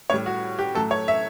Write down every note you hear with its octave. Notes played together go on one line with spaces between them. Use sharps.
A2 G3 C#5
F#4
G4
A2 F#3 A3 A4
C#5
E5